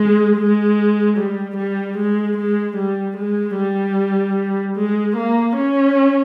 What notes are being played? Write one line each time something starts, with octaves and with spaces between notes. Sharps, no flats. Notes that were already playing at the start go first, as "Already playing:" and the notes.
Already playing: G#3
G#3
G3
G3
G#3
G#3
G3
G#3
G3
G#3
A#3
C#4